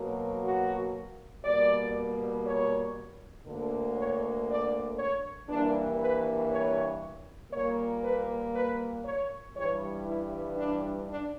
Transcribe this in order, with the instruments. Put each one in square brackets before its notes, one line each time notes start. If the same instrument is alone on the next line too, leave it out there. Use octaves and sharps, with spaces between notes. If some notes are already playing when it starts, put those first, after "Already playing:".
Already playing: [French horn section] B2 F#3 A#3
F#4
B2 G3 A#3 D5
C#5
D2 D3 A#3
C#5
D5
C#5
G2 E3 G3 A#3 D4
B4
C#5
A#2 G3 A#3 C#5
B4
B4
C#5
G2 E3 G3 C#5
E4
D4
D4